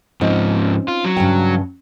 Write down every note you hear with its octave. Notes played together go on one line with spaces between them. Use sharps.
G#2 F3 C4 C#4 D#4
F4
F#3
G2 C#3 G5